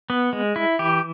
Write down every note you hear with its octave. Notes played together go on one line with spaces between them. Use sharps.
B3
G#3
E4
E3 G4